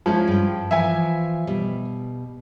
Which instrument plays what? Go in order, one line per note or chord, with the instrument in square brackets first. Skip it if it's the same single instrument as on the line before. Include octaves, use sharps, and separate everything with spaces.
[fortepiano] F3 [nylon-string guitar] G#3 C#4 E4
[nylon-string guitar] G2 G5
[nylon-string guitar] E3 F3 [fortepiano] E5 G#5
[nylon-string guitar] B2 G3